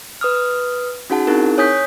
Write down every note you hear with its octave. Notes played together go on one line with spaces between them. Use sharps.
B4 D#6 F6
C#4 D#4 F#4 G#4 F#5 A5
C4 D#4 E4 G#4 A#4
C#5 G#5 D#6 G6 B6